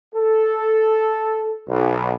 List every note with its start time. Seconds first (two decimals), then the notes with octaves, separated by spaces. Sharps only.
0.14 A4
1.68 B1